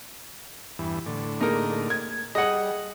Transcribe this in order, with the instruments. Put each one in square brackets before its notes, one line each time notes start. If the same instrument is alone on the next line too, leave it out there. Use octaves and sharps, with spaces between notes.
[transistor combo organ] E2 G2 E3
A2 D3
[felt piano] A#3 G#4 [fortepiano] D#4 A#4
[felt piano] G#6
[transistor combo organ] G3 [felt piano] G#4 [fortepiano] D#5 F#5